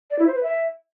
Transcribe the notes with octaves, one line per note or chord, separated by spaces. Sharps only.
D5
E4
C5
B4
E5